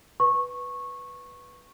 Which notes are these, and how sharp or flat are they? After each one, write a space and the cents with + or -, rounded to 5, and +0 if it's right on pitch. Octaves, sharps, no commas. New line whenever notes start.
B4 +0 C#6 -15